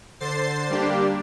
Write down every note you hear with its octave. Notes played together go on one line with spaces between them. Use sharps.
D3 C5 A6 C7
G3 A#3 D4 G4